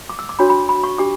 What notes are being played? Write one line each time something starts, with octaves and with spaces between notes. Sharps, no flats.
D6
E6
D6
D4 F#4 C#5 B5
B5
B5
C#6
D4 G4 D6